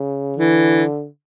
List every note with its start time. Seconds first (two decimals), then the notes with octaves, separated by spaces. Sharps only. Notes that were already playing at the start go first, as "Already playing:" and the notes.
Already playing: C#3
0.37 D3 E3